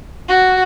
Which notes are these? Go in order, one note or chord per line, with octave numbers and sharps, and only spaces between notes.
F#4